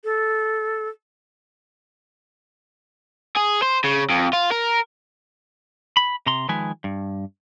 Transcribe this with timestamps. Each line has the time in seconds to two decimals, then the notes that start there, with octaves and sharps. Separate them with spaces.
0.04 A4
3.36 G#4
3.62 C5
3.84 C#3
4.09 F2
4.33 F4
4.52 A#4
5.97 B5
6.26 C3 A#5 C6
6.49 D#3 F3 G#3 B4 G#5
6.84 G2